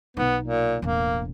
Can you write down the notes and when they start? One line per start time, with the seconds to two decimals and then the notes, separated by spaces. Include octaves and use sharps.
0.17 B1 B3 D#4
0.43 A#2
0.82 E1 A1 A#3